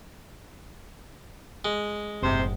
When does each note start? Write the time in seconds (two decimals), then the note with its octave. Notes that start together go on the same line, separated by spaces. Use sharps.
1.65 G#3
2.22 F#1 A2 C3 C5